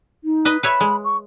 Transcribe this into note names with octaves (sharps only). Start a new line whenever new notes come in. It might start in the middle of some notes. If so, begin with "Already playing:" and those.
D#4
B4 D#5
B4 C#5 E5 B5
G#3
C#6